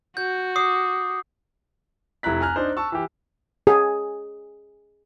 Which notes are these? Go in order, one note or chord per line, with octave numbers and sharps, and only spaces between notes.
F#4 G6
D6 D#6 C7
F1 E4 A#5 F#6 B6
G#5 A#5 F6 F#6
D4 D#4 C5
A5 C#6 E6
E3 G4
G#4